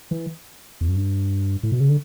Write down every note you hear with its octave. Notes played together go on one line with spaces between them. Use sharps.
E3
E2
F#2
G2
A2
B2
C#3
D3